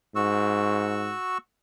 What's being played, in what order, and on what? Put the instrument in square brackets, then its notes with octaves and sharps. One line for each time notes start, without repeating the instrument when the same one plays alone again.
[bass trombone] G#2 [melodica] F#4 C#6 E6